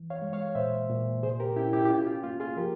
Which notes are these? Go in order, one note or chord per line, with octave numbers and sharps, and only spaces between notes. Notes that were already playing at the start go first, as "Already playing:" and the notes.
Already playing: E3
C#5 F5
G#3
C#5 F5
A#2 C5 E5
A#2
C3 G#4 C5
G4 A#4
C#4 E4 G4
E4 G4
G4
C#4 F4
F4
A#3 F4
F4 G#4
F3 G4 A#4